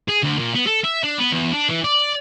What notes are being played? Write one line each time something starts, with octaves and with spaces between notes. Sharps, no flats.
G#4
D2
A#2
B3
A4
E5
D4
B3
E2
D4
E3
D5